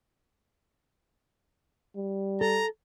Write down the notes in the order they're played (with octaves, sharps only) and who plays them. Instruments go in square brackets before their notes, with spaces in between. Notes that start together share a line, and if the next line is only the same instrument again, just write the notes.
[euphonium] G3
[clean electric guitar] A4 [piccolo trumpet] A#5